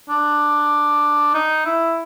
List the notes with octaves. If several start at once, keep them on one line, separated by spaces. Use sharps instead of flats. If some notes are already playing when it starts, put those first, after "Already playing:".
D4
D#4
E4